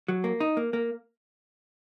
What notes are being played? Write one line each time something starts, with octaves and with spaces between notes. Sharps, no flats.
F#3
A#3
D#4
A#3
A#3